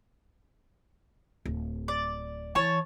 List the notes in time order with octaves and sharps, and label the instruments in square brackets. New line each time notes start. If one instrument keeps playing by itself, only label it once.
[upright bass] D1
[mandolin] D5
[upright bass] E3 [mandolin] C#5 A5